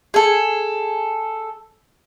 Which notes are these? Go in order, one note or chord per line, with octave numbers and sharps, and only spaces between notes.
G#4 A4